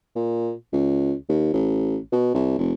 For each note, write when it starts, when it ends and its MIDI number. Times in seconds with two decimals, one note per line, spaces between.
0.15 0.53 46
0.73 1.14 37
1.29 1.52 39
1.53 1.97 33
2.12 2.34 47
2.34 2.54 36
2.58 2.73 29